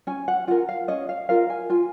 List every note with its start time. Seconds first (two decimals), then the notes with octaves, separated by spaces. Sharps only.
0.07 C#4 G#5
0.28 F#5
0.47 F4 A#4 F#5
0.69 F5
0.88 C#4 D#5
1.09 F5
1.29 F4 A#4 F5
1.50 G#5
1.70 F4 G#5